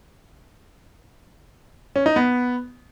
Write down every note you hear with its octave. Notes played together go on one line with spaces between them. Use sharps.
C#4
D#4
B3